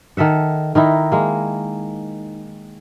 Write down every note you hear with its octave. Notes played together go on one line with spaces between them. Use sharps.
D#3 A4 E5 F#5
D#3 D#4 E4
G#3 A#3